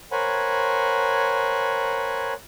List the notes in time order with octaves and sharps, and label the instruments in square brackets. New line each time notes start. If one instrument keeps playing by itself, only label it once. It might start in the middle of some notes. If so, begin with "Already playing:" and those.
[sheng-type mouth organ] A#4 C5 C#5 F#5 G#5 B5